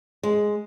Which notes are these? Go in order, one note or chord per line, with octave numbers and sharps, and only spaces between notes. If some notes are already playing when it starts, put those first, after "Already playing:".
G#3